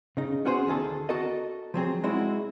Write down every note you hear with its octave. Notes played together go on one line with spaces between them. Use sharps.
C#3 D#4
B3 C#4 F#4 G#4 C5
D2 D#3 G#4 A4
F#4 A4 A#4 D#5
F3 F#3 C4 G#4
G#3 C4 D#4 E4 F#4